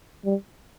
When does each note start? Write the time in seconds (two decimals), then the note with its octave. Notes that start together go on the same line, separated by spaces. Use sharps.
0.25 G3